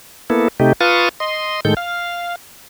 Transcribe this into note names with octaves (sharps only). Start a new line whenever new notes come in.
A#3 B3 E4 A4
C3 A3 D#4 G4
F4 B4 F5 A5 C#6 D#6
D#5 C6
A2 D#3 G#3 A4 G6
F5